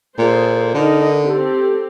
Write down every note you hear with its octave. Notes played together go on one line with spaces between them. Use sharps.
A#2 G#4 A4 C5
D3 D#4 A#4
C4 G4 A4